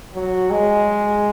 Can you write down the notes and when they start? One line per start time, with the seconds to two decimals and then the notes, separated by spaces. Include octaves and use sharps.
0.14 F#3
0.50 G#3